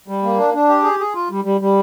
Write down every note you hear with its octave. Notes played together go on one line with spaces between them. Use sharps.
G3
A#3
D4
D4
G4
G#4
G#4
F4
G3
G3
G3